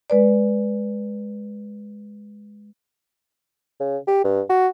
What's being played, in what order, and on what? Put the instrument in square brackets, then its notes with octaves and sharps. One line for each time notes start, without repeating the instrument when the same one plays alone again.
[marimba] G#3 B4 D5
[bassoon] C#3
G4
G2
F#4